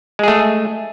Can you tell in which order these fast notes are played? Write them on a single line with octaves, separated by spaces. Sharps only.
G#3 G#4 A3